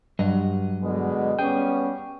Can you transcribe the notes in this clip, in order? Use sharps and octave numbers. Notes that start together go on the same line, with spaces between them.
G2 F#3 D#5
B2 D3 G#3
G3 B3 C#4 G#4 G5